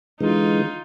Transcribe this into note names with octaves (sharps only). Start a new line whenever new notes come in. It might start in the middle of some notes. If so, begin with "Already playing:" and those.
D3 E3 G#3 D#4 F4